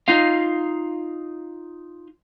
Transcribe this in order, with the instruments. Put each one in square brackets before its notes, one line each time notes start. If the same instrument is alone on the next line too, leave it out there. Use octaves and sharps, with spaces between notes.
[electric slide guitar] D#4 F4 F5